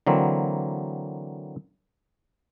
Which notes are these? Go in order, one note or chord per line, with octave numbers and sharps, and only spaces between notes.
D3 E3 F#3 A#3 C4